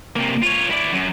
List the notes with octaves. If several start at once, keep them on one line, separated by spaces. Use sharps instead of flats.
C3 A#3
F4 C#5
E4 D5
F#2